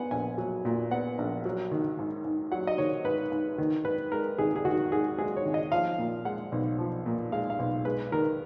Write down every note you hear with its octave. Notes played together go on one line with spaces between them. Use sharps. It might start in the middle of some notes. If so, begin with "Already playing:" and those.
Already playing: B3 F#5 G#5
A#1 G#5
F#3
A#2
B3 F#5
A#1
F#3
D#3
G#2
G#2
F#3 F#5
D#5
D#3 C#5
G#2 B4
G#2
D#3
G#2 B4
G#3 A#4
G#1 G#4
G#4
D#3 F#4
G#2 G#4
G#3 G#4
C#5
G#1
D#5
F3 F5
A#2
G#3 F#5
B1
F3
A#2
G#3 F5
F5
B1
G#3 B4
D#3 A#4